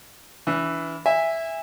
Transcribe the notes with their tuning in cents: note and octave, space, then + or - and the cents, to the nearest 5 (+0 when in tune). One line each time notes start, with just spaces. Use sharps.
E3 +0 D4 -45
E5 +0 G#5 -25